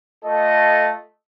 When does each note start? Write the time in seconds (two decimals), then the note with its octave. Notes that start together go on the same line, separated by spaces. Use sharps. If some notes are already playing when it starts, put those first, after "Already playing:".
0.25 A3 F4 A4 D#5